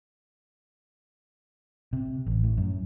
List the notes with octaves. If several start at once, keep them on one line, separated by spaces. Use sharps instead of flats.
C3
A1
A2
F#2